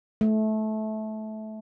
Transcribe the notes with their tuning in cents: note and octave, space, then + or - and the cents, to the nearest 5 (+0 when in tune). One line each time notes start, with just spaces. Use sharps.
A3 -20